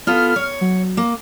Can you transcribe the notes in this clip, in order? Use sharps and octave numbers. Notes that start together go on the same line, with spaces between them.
B3 F4 A4 F6
C#5
F#3
A#3